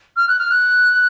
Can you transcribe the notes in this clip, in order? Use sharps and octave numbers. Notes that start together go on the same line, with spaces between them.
F6
F#6
F6
F#6